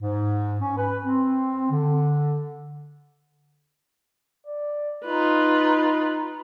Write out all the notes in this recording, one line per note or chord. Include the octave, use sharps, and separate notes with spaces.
G#2
C#4
B4
C4
D3
D5
D#4 F4 B4